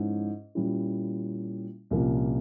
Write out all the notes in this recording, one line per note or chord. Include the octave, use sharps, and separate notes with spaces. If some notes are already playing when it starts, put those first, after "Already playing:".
Already playing: G#2 F3 G#3 C#4 E4
A#2 G3 C#4 E4
C2 A#2 F3 A#3 C#4